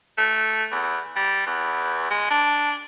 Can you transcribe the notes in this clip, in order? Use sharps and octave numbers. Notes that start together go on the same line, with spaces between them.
A3
E2
G3
E2
G#3
D4